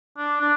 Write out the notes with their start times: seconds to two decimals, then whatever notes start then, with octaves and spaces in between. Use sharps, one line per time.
0.17 D4
0.41 D4